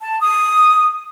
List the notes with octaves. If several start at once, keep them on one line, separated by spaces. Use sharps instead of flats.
A5
D#6